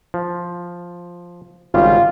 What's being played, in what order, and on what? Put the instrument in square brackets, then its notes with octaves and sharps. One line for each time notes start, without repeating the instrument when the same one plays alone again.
[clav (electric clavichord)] F3
[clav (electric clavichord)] G#1 C#3 G3 [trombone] F4